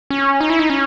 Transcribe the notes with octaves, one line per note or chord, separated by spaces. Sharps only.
C#4
D#4
E4
D#4
C#4